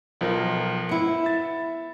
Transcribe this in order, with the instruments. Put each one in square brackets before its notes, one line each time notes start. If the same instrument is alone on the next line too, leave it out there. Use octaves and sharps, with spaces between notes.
[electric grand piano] B1 F3 A#4
[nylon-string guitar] B3 E4 [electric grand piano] C#7
[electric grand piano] E5 A6